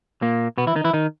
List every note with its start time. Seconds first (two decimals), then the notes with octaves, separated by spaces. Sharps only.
0.22 A#2 A#3
0.58 B2 B3
0.67 E3 E4
0.76 D#3 D#4
0.84 E3 E4
0.93 D#3 D#4